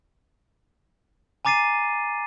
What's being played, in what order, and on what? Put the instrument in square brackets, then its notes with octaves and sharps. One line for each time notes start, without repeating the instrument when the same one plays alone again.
[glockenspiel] G#5 A#5 D6 A6 C7 D#7